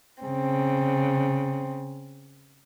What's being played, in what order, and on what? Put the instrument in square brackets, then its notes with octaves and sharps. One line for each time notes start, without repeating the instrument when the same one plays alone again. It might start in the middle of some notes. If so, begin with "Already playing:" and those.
[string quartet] C#3 C4